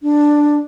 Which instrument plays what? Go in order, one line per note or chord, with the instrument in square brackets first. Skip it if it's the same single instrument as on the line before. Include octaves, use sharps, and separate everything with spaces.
[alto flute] D4